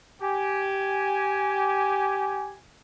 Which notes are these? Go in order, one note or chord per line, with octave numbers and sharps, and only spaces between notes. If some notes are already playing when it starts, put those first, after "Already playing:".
G4 G#5